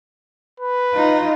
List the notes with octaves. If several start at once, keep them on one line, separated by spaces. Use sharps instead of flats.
B4
D#4 F4